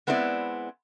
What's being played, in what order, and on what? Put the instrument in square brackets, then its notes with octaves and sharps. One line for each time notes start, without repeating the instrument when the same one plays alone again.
[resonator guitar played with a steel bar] G#3 B3 C4 E4 C5 D5